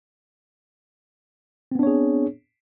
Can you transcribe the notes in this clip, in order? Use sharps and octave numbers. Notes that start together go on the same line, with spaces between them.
B3 C4 D4 G#4 C#5